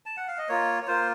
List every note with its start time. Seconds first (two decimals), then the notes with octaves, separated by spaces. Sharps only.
0.06 A5
0.17 F#5
0.28 F5
0.38 D#5
0.49 A#3 F4 C#5
0.82 C#5
0.87 A#3 F4 C5